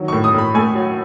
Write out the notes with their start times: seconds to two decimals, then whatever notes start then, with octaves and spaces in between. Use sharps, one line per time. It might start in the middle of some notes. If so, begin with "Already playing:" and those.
Already playing: D#3 F#3
0.08 C#6
0.13 A2
0.24 D#6
0.34 A2 B5
0.54 A3 G#5
0.74 F#3